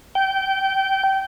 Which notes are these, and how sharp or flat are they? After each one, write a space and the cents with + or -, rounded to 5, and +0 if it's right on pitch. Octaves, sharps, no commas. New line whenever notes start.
G5 -20